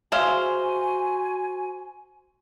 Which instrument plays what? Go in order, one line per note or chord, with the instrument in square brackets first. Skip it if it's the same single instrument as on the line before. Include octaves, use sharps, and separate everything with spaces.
[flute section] F#4 G#5 [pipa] G#4 E5 F5 [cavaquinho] C5